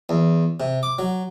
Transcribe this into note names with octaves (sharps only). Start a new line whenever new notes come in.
E2
C3
D6
F#3